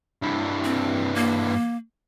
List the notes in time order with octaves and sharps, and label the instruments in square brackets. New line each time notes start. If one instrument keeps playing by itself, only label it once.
[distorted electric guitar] G2 E3
[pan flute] C4
A#3